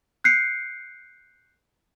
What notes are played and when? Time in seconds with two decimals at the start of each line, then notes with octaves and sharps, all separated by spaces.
0.24 F#6 G6 C7 C#7